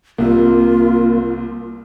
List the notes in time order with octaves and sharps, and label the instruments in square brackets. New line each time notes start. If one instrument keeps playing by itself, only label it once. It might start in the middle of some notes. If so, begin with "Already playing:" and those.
[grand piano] C2 C3 [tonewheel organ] A#3 [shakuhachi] F4